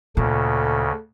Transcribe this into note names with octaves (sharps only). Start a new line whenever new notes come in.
D2 A#2 C#3 A4